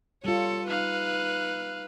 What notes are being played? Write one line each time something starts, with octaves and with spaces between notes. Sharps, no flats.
G3 F4 A4 C#5
D#4 B4 F5 F#6